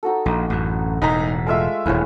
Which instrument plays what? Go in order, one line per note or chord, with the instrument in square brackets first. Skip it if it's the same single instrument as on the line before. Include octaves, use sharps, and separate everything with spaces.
[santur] D#4 F#4 A4
[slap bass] A#1 [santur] D#4
[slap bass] A1 F#2
[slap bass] E1 A2 [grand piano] D#4 A#5 [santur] B5
[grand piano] G#3 F4 E5 [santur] A3 F5 E6
[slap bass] D#1 D2 [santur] E4 G#4 C#5